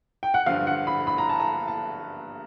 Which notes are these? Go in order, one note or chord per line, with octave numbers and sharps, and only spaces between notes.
G5
F#5
G2 D3 F3 F5
F#5
B5
B5
A#5
A5
A#5
A5